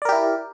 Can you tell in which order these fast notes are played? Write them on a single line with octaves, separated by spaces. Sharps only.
D5 A#4 G4 E4